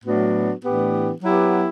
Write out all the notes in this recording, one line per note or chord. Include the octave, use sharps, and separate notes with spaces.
A2 F#3 B3 D4 F#4
A2 E3 B3 D4 G4
F#3 B3 E4 G4